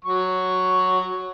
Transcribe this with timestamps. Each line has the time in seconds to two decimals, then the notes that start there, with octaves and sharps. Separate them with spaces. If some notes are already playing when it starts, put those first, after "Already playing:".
0.05 F#3 C#6